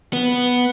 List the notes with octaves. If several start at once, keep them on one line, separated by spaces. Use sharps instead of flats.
B3